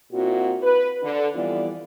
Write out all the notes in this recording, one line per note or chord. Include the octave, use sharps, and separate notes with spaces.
A#2 C4 E4 F#4
B4
D3
F2 E3 G3 B3 F4 D5